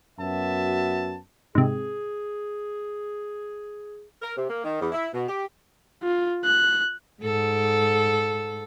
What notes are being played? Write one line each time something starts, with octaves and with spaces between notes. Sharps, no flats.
F#2 B3 F#4 E5 A5
G#2 C3 G#4
A#4
C3
A#3
D#3
E2
E4
B2
G4
F4
F#6
G#2 A4